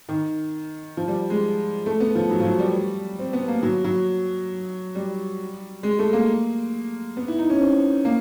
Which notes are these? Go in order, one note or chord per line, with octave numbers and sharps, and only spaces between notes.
D#3
F3
G3
G#3
A3
B3
F3
F#3
F3
F#3
G3
C4
B3
A#3
F#3
F#3
G3
G#3
A3
A#3
B3
E4
D#4
C#4
C4
A#3